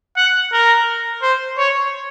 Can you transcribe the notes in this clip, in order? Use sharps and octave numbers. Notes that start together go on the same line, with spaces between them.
F#5
A#4
C5
C#5